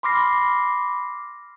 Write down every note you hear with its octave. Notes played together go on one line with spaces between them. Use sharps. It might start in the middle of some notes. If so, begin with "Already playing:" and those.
B5 C6 D6 F6 A#6 C7